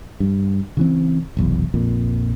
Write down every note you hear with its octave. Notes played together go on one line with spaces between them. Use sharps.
G2
C#3 E3 C4
F1 B1 E2
A#1 F2 A#2